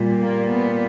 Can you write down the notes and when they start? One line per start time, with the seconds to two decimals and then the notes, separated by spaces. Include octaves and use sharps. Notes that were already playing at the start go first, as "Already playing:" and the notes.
Already playing: A#2 G3
0.21 A#3
0.49 B3